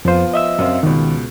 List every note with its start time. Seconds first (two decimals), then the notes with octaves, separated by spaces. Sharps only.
0.05 F2 F3 B3 F4 C5
0.34 D#5 E5 E6
0.59 F#2 C4 F5
0.83 C#2 B2 D#3